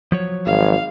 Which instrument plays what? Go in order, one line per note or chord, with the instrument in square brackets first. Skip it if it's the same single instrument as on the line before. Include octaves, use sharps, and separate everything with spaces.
[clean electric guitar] F3 F#3 C#5
[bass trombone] G#1 [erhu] F5